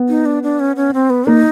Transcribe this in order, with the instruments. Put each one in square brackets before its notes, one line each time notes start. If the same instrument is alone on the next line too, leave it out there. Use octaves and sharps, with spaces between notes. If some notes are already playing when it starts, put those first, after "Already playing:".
Already playing: [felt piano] B3
[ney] D#4
D4
D4
C#4
C#4
C4
B3
[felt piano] A#3 [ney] D#4